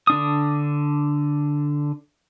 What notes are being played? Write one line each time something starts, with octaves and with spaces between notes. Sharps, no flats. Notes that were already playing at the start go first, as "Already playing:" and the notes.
D3 D4 D#6